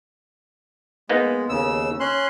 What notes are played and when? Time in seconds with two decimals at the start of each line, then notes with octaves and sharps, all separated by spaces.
1.09 G#3 A#3 B3 D#4
1.49 D#2 C#3 E6
2.00 C#4 C6 F#6